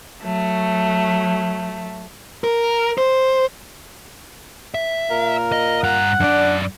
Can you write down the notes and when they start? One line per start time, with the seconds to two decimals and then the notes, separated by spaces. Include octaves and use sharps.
0.22 F#3 A3
2.44 A#4
2.98 C5
4.74 E5
5.09 A#2 A#4 F5
5.52 D#5
5.83 G2 F#5 A#5
6.20 F#2 D4 D5